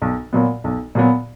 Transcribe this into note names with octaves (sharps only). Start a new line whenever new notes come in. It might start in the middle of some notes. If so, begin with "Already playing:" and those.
B1
A#2 F#3 B3
B1
A#2 F#3 B3